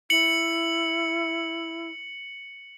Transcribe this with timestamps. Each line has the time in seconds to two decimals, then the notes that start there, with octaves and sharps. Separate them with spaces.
0.10 E4 C#7 F#7